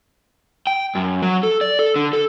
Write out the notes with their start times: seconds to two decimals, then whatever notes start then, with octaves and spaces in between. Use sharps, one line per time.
0.67 G5
0.95 F#2
1.22 F#3
1.43 A4
1.61 D5
1.79 A4
1.96 D3
2.13 A4